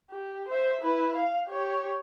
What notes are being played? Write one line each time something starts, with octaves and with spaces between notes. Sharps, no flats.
G4
C5 E5
E4 B4
F5
G4 C#5